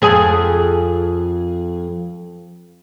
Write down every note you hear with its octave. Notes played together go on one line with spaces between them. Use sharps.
F2 G#4